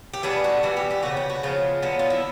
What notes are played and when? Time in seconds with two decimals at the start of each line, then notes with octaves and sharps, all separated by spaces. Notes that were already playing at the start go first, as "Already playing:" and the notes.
0.14 G4
0.23 E3 G3 B3 D4 G#4
0.44 F#4
0.63 E3 G3 B3 D4 F#4
0.77 G4
0.91 G4
1.03 C#3 F3 G#3 B3 F#4
1.17 G4
1.30 F#4
1.43 C#3 F3 G#3 B3 F4
1.82 D3 F#3 B3
1.99 F4
2.10 E4